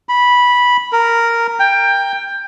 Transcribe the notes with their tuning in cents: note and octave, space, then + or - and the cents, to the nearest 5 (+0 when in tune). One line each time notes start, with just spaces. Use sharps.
B5 -10
A#4 -5
G5 +15